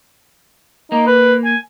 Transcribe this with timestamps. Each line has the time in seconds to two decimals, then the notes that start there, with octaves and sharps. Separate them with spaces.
0.92 A#3 D#4
1.07 B4
1.45 G#5